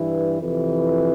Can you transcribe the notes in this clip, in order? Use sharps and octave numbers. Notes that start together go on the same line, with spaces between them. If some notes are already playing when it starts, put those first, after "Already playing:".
Already playing: G2 E3
F2 C3 E3